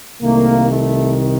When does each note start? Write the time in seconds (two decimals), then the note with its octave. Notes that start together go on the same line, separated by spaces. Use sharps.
0.22 C2 C3 D#3 A3 A#3
0.68 A3